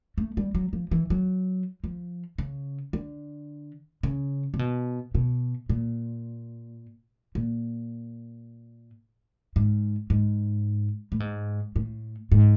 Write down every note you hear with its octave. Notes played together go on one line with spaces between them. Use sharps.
A3
G3
F#3
F3
E3
F#3
F3
C#3
D3
C#3
C3
B2
B2
A#2
A#2
G#2
G#2
A2
G#2
A2
G#2